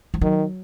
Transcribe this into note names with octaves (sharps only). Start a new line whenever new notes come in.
F3
D#3 F#3